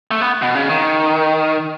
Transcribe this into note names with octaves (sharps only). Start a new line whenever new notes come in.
A3
B3
B2
C#3
D#3